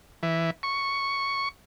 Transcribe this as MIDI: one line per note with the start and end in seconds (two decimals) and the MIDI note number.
0.23 0.50 52
0.63 1.49 85